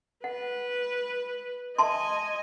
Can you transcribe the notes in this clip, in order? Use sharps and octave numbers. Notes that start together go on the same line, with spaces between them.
B4 F#5
D#5 E5 G#5 A5 C6